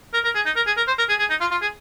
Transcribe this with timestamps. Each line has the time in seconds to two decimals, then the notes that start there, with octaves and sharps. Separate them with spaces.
0.14 A#4
0.24 A#4
0.35 G#4
0.46 D#4
0.56 A#4
0.67 G#4
0.77 A#4
0.87 C5
0.98 A#4
1.09 G#4
1.19 G#4
1.30 D#4
1.41 F4
1.51 F4
1.62 G#4